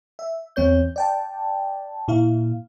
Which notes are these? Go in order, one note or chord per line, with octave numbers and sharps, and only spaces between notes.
E5
E2 C4 C#5 G6
D5 G5 A5
A#2 E4 F5